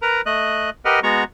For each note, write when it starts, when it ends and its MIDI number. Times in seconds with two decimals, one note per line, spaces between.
0.02 0.21 70
0.02 0.21 71
0.02 0.21 82
0.26 0.70 57
0.26 0.70 75
0.26 0.70 90
0.85 1.00 67
0.85 1.00 70
0.85 1.00 71
0.85 1.00 75
0.85 1.00 78
0.85 1.00 89
1.03 1.24 56
1.03 1.24 59
1.03 1.24 66
1.03 1.24 82
1.03 1.24 85